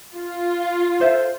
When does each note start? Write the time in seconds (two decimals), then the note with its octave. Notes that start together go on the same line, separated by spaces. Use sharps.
0.15 F4
1.00 A4 C5 E5